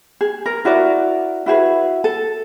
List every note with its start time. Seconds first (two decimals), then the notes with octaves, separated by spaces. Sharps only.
0.21 G#4
0.46 A#4
0.65 E4 F#4 A#4 D5
1.46 E4 F#4 G#4 B4
2.04 A4